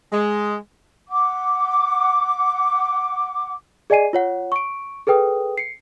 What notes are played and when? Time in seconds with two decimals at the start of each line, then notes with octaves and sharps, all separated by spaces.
0.12 G#3
1.09 F#5 D6
3.90 G#4 D5 D#5 G#5 C7 D#7
4.13 F4 C#5 F#5
4.52 C#6 D7
5.07 G#4 A4 B4 G5 D#6
5.58 C7 C#7